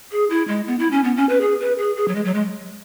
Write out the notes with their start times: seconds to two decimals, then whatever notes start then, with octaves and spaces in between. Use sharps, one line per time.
0.11 G#4
0.30 E4
0.48 G#3
0.67 B3
0.79 E4
0.92 C#4
1.04 B3
1.17 C#4
1.29 B4
1.41 G#4
1.60 B4
1.78 G#4
1.96 G#4
2.08 F#3
2.15 G#3
2.25 F#3
2.34 G#3